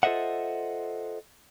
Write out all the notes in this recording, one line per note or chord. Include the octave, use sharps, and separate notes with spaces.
F4 A4 C5 D#5 E5 F#5